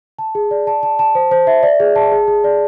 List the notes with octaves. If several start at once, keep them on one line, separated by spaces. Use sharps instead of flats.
A5
G#4
D5
A5
A5
A5
C5
C5
E5
D5
G#4
A5
G#4
G#4
D5